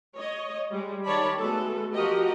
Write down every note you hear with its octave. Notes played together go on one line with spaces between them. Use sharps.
C#5 D#5
G3 G#3
D#3 C#5 D5 A5 B5
G#3 A3 B3 F#4 A4
F3 F#4 G4 A#4 D#5